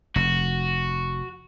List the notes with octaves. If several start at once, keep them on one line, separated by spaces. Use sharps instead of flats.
F1 F#4